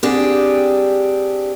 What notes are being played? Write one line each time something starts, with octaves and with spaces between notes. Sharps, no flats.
C4 D4 G4 G#4